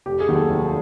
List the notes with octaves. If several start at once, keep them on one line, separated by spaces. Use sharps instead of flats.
F1 G4
G#4
D#2 D#3 F#3
A4
F1